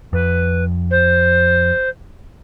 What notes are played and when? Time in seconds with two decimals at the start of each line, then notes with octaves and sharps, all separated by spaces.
0.13 F2 B4
0.90 C5